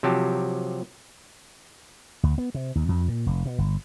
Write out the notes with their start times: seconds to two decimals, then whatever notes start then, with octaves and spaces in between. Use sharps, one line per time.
0.03 C3 F3 F#3 G4 A5
2.23 D2
2.38 B3
2.55 C3
2.75 D#2
2.89 F2
3.08 A#2
3.26 F1
3.46 B2
3.58 G1